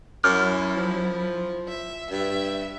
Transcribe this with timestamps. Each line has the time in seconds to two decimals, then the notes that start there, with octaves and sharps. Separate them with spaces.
0.24 F#2 F#3 E4 D6 F6 G6
0.77 F3
1.67 E5
2.10 G2 E5